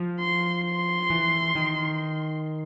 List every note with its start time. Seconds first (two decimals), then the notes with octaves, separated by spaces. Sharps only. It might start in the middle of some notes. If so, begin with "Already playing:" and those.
Already playing: F3
0.19 C6
0.65 C6
1.10 E3
1.55 D#3